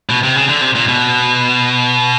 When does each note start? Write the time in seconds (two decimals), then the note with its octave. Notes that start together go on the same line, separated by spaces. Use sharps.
0.09 B2
0.23 C3
0.36 C#3
0.49 D3
0.61 C3
0.75 A#2
0.88 B2